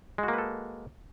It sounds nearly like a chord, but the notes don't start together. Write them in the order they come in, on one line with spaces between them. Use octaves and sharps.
G#3 F#4 A#3 B4 A4